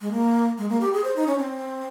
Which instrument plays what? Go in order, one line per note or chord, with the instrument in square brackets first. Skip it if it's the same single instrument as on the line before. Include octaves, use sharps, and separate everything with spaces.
[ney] G#3
A#3
G#3
A#3
G4
G#4
C5
D#4
C#4
C4